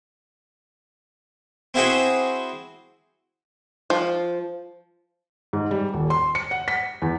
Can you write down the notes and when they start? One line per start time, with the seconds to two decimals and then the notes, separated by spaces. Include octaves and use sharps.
1.74 C4 E4 F#4 G#4 C5 G5
3.90 F3
5.53 G#2
5.71 G3
5.94 D#1
6.10 C6
6.35 C#7
6.51 F#5
6.68 B6
7.02 E2